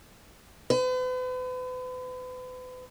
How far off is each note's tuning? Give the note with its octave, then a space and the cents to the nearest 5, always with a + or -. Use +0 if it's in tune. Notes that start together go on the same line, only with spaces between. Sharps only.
B4 +40